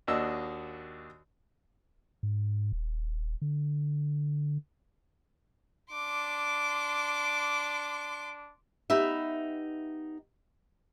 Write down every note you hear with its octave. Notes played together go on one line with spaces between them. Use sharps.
D#2 A#3 D4 F#4 D#5 E6
G#2
D#1
D3
D4 C6 D6
B3 D#4 G4 E5